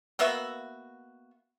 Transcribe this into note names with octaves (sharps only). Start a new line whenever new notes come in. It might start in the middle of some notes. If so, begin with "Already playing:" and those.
A#3 B3 F#4 E5